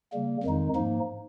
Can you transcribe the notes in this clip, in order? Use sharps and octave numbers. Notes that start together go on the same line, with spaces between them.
C#3 G3 A#3
F2 D#3 G#3 D#4
G#2 F3 A#3 D#4